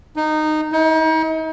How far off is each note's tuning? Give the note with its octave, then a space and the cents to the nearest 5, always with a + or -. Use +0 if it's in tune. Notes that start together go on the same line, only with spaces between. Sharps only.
D#4 -15
D#4 +40